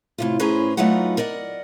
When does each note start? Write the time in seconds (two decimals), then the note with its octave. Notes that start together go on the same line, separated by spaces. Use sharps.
0.18 A2 C3 F4
0.40 A2 C#4 G#4 B4 C5 A#5
0.77 F#3 A3 B3 D#4 F4 F#5
1.17 A#4 D5 D#5 F#5